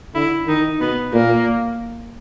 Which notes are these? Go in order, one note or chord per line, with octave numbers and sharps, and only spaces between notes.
D3 E4
D#3 D#4
B2 B3
A#2 A#3